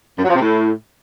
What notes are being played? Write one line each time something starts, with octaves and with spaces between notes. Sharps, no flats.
F#2
F#3
F3
C3
A2